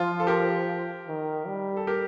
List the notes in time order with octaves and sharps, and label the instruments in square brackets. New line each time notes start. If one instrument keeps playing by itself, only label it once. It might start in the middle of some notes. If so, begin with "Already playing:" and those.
Already playing: [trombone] F3 [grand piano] F4
[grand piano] A4
G4 A#4
[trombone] D#3
G3
[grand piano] A4
G4 A#4